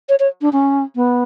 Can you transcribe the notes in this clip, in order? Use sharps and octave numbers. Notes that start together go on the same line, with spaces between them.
C#5
C#5
D4
C#4
B3